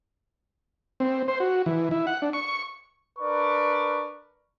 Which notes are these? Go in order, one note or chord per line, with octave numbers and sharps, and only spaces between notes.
C4
C5
F#4
E3
E4
F#5
D4
C#6
D4 A#4 B4 D5 C#6